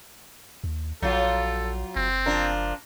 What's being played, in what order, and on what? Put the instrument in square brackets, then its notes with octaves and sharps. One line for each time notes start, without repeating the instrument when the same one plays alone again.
[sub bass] D#2
[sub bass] A#1 [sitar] F#3 F4 [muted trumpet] A4
[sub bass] F#1 [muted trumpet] C4
[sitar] F3 D4 A#4